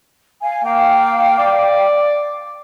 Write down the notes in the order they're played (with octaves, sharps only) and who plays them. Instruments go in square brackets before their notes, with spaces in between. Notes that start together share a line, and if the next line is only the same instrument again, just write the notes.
[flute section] F5 G#5
[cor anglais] A#3 [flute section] F5 G5
[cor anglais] D5